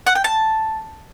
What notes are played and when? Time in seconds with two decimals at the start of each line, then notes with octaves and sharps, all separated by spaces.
0.07 F#5
0.15 G5
0.24 A5